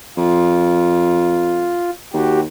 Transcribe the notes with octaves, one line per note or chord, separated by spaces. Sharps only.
F2 F4
D#2 F#4 G4